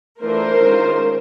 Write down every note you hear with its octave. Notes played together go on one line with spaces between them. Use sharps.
E3 A3 D4 F4 A#4 C5
D#3 G#3 C#4 F4